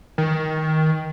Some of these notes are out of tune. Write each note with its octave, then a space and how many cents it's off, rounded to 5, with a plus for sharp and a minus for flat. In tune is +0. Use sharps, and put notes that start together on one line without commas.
D#3 +15